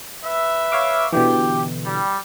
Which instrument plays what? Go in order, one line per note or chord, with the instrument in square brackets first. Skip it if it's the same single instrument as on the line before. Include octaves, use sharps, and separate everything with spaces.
[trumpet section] B4 E5
[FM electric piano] C#5 F5 D6
[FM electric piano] B2 D3 E3 [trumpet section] G4
[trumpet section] G3